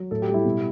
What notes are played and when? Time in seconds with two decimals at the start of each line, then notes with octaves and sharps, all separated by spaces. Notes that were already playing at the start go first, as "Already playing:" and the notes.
Already playing: F#3
0.11 A2 A4
0.22 G4
0.28 G3
0.34 E4
0.45 B2